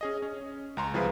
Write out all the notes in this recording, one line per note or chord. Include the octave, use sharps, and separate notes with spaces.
C#4 G#4 D#5
C#4
C#2 A#5 C6
C2 F3 E4 G#4 B4 F5